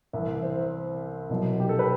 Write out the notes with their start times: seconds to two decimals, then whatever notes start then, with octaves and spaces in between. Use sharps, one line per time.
0.13 C2 C3 E3 E5
0.43 C5
1.30 C2 B2 F#3
1.60 G4
1.69 A4
1.79 B4